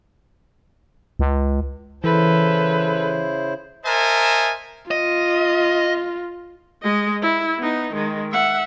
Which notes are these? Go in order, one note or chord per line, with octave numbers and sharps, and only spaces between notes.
C#2
C#3 E3 E4 A4 B4 C5
A#4 C5 D#5 E5 G#5 A5
F4 D#5
G#3 D#5
E4
B3 D#4
D#3 G#3
E5 F#5